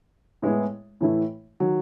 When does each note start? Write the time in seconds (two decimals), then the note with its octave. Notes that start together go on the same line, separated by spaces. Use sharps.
0.42 A2 G#3 B3 E4 G#4
1.00 A2 E3 A3 E4
1.60 D#3 F#3